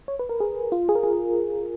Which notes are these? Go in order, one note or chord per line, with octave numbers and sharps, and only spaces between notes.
C#5
B4
A#4
G#4
F4
G#4
A#4
G#4